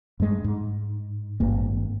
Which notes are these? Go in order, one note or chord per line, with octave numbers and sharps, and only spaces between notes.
G2 G#3
G#2
G#1 G2 A#3